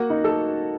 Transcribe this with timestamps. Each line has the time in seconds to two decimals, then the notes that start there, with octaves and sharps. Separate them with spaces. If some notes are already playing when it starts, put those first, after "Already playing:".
Already playing: A#3 F#4 F#5
0.10 D#4
0.24 A4 A5